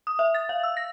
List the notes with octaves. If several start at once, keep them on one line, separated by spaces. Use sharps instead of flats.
D#6
E5
A6
F5
E6
A#6